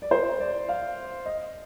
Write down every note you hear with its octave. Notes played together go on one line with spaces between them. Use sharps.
D5
C5
D5
F5
D#5